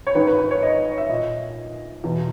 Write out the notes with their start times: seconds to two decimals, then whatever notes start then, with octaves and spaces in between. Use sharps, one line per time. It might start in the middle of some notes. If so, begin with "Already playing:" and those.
0.07 C#5
0.15 G#2 D#3 B4
0.27 B4
0.38 B4
0.51 C#5
0.63 D#5
0.98 E5
1.09 A#2 D#5
2.04 E2 B2